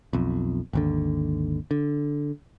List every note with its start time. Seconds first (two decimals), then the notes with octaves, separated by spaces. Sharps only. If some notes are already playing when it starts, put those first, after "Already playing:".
0.13 B1 F2
0.73 G#1 D#2 D3
1.71 D3